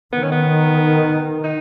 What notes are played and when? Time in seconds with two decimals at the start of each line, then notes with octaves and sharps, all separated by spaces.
0.12 D#3 B3
0.23 C#4
0.32 B3
1.44 D#4